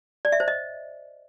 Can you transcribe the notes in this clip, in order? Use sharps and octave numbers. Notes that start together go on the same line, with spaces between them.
D5
E5
C5
D#5